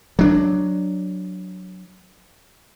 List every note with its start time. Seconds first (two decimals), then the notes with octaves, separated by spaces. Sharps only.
0.19 F#3 D4